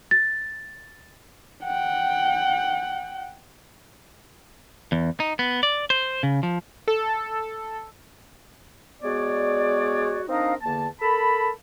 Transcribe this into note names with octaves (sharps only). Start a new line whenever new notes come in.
A6
F#5 G5
E2
D#4
B3
D5
C5
C#3
F3
A4
G#3 B3 F#4 C#5 D5
C4 D4 D#4 A#4 D#5 F5
E2 D3 A#3 A5
A4 A#4 A5 B5